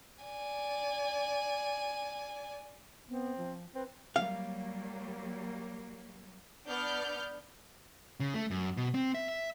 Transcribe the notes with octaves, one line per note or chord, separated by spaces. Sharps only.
D5 G#5
B3 C4
F3
C4 B4
F#3 G3 A#3 F5
B3 D4 D5 F6 G6
C#3
A3
F#2
B2
C4
E5
E5